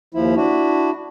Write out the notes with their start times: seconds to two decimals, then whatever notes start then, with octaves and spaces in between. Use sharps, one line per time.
0.14 D#2 F3 E4
0.37 D4 E4 F#4